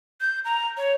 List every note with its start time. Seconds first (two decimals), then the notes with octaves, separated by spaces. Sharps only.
0.21 G6
0.45 A#5
0.77 C#5